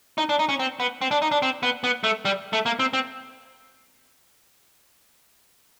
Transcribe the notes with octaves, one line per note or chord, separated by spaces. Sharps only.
D#4
D4
D#4
C#4
C4
B3
C4
D4
D#4
D4
C4
B3
B3
A3
G3
A3
A#3
C4
C4